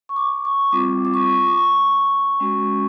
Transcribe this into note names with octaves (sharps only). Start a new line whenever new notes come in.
C#6
D6
C#6
G3 C4 F4 D6
D6
C#6
D6
C#6
G#3 C#4 F#4